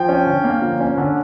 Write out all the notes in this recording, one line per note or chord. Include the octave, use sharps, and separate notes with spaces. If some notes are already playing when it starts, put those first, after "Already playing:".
Already playing: F3 G5
C#4
D3
A#3
F3
C#4
D3